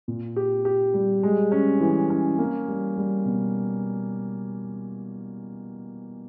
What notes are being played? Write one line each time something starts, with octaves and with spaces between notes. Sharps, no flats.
A#2
G4
G4
G3
G#3
C#4
E3
C#4
A#3
G3
G3
B2